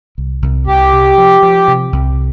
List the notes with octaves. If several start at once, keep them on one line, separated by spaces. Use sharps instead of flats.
C2
C2
C2 G4
C3
F3
F3
C3
C2